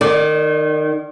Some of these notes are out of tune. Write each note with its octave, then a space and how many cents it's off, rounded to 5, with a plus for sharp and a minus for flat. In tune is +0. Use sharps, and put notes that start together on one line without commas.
D#3 -25 D5 +0